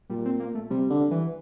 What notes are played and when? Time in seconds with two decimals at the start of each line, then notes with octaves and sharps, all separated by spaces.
0.10 A#2 G3
0.25 C4
0.40 A#3
0.55 A3
0.70 C3 G3
0.90 D3
1.00 G3
1.11 E3